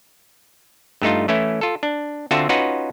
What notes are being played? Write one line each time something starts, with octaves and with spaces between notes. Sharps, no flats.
G2 A3 D#4 F4
E3 A3 C#4 E4
F4 A4
D4
D3 C4 F4 F#4 E5 A5
C#4 D#4 F4 F#4 B4 F#5